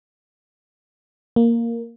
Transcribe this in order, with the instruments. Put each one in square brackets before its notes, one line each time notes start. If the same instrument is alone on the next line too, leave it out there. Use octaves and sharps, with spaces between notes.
[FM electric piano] A#3